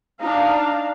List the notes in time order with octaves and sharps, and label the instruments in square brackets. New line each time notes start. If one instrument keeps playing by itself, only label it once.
[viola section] D4 D#4 F5